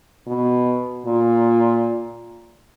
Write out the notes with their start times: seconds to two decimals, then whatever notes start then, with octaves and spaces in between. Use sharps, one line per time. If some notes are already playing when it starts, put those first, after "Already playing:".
0.27 B2
1.06 A#2